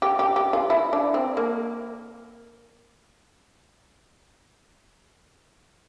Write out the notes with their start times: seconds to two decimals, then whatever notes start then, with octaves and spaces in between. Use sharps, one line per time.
0.02 G4
0.19 G4
0.36 G4
0.53 F4
0.70 E4
0.93 D4
1.14 C4
1.37 A#3